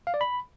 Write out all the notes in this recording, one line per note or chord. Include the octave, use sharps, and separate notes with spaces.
F5
D5
B5